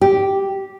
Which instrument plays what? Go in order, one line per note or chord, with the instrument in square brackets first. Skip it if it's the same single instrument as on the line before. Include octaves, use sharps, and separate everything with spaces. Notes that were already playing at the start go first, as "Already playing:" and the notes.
[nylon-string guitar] G4